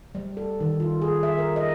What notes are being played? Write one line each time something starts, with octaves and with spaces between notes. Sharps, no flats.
G3
A4
D#3
F4
G#4
E5
A#4
D#5